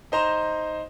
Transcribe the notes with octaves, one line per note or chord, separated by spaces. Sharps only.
D#4 C5 A#5 E7